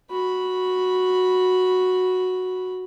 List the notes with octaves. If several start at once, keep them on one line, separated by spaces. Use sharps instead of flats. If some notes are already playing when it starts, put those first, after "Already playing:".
F#4 B5